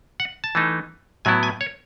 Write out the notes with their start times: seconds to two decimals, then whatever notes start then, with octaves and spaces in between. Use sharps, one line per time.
0.20 F#5
0.44 A5
0.55 E3 A3 D#4
1.25 A2 F#3 B3 E4 G#5
1.43 G#5
1.61 C#5